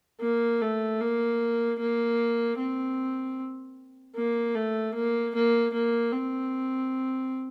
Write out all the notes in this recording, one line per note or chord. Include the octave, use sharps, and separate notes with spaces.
A#3
A3
A#3
A#3
C4
A#3
A3
A#3
A#3
A#3
C4